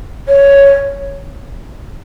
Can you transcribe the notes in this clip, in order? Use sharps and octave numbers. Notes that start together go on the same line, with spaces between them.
C#5